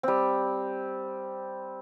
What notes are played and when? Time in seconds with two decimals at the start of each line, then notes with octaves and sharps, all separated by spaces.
0.03 G3 C4